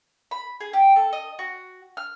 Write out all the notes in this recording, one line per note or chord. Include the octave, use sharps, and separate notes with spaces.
B5
G#4
G4
A4
D#5
F#4
F6